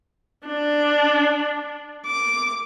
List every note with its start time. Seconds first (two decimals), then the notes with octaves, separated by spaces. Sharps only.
0.46 D4
2.06 D6